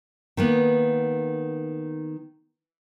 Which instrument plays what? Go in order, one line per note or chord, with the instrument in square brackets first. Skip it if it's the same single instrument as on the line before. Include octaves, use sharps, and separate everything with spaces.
[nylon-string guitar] D#3 A#3 B3